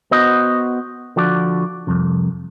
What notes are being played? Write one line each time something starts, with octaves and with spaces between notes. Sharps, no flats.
B3 F#4 C5 D#5
D3 F3 F#4 D5
C2 F2